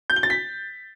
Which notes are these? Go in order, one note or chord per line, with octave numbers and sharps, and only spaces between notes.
G6
G7
A6
B6